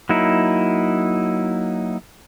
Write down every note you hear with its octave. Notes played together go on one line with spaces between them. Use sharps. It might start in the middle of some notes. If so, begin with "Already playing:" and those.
F#3 A#3 D#4 E4